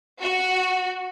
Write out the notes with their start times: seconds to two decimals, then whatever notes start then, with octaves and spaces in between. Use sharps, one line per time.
0.22 F#4